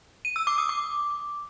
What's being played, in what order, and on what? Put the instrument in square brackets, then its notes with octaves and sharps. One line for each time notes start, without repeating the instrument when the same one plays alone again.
[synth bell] D#7
E6
D6
D#6
D6